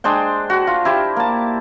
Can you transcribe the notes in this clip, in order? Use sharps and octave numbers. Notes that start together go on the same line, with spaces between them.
G#3 D4 C5 G5
F#4
F4
E4 G4 C5
A#3 A5